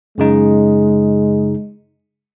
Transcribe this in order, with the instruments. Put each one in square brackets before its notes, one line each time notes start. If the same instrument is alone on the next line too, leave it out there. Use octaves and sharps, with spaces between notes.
[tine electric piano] F#2 C#3 D#4 [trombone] G#3